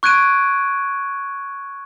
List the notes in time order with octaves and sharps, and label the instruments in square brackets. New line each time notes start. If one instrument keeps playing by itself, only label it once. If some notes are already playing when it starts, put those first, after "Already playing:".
[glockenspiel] C#6 F#6 G#6 D7 D#7